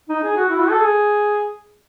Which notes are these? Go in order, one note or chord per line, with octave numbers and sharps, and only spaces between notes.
D#4
G#4
F#4
E4
F#4
A4
G#4